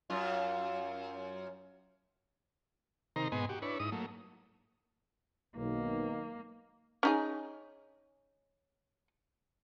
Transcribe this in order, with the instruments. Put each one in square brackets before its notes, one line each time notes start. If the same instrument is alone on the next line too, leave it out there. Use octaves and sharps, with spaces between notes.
[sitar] F#2 F4
[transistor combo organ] C3 D#3 D#4 A#4 C5 A#5
G#2 B2 B3 D#5 G#5 C6
F#4 G4
D4 E4 B4 C#5
G#2 D#4 E4 D#6
F#3 A3 A#3
[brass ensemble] B1 [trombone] D#3 [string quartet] A#3
[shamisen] C#4 D#4 G#4